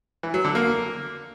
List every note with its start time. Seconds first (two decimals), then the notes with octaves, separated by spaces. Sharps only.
0.23 E3
0.34 F#3
0.44 D3
0.55 A#3